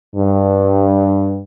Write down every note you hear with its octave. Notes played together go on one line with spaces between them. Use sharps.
G2